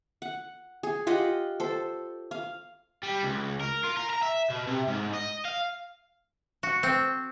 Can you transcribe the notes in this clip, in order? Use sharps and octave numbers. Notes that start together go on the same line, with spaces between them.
F#5
G#4
F4 G4 D#5 F#5
A4 C5
F5
G3
C#2
A#4
F4
A#4
A#5
E5
B2
C3
G#2
D#5
F5
F#4
C4